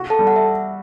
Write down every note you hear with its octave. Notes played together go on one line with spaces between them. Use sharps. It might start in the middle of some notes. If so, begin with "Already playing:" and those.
Already playing: F#4
A4 A5
G3
F#5
E5